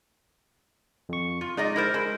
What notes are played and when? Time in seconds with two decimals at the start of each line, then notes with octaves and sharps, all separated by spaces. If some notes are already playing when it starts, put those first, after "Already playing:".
1.09 F2 C#6
1.41 F4
1.57 G#3 D#4 D5 D#5
1.76 E4 A#4 C5
1.94 G#3 E4